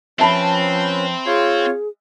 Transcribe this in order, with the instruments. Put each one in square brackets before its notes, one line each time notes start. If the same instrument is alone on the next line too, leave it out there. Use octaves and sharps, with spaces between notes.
[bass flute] F3 [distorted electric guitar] C4 [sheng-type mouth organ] C#4 B4 [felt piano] E5 A5 B5
[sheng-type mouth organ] F4 C#5 [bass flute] G#4